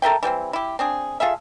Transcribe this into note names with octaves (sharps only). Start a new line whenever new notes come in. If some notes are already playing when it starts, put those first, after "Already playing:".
A4 A#4 E5 G5
E3 G3 B3 C4
E4 G4
C4 D4 G#4
F4 G#4 A4 E5